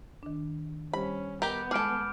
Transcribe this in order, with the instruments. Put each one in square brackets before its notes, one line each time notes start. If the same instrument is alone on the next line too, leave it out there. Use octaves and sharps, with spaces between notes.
[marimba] D#3 D4
[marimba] G3 G4 C5 [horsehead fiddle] C#4 [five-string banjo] B5
[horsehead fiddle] B3 [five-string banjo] G4 A#4 [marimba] D#5 [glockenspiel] G6
[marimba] G#3 [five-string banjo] G#4 A4 [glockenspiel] D6 F6 D7